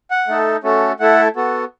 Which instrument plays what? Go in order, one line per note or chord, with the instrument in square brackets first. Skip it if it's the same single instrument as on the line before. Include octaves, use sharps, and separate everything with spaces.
[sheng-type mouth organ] F#5
A3 D#4 A4
A3 C#4 F#4 A4
A3 E4 A4 F#5
B3 F#4 A4